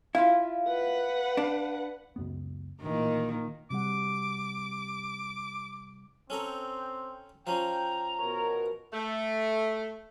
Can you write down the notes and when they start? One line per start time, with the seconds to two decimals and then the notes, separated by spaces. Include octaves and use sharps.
0.15 E4 F4 F5
0.68 B4 F#5
1.37 D4
2.16 C#2 F#2 B3
2.82 A1 A#2 D#3 E3
3.70 C3 G3 F#5 D6
6.30 C4 C#4 A4 A#5
7.47 F3 C#4 G5 A#5
8.19 B2 A#4 C#5
8.93 A3